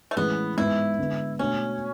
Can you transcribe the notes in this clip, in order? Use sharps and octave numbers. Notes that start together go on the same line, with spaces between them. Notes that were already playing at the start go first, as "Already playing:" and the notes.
A3
A2 E3 G#3 B3 C#4 G#4
G#2 G#3 B3 E4
D3 G#3 B3
B2 A3 C#4 D4